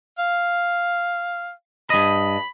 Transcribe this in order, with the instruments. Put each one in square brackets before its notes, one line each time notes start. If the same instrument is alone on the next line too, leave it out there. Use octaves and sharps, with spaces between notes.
[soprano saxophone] F5
[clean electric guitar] G2 D#5 [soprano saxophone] B5